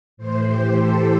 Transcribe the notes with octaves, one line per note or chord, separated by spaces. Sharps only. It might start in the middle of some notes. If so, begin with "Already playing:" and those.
A2 E3 C5
G4
A4